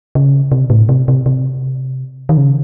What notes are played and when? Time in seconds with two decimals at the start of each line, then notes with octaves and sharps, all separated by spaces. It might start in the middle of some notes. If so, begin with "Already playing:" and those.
0.15 C#3
0.52 C3
0.70 A2
0.89 C3
1.08 C3
1.26 C3
2.29 D#3
2.37 C#3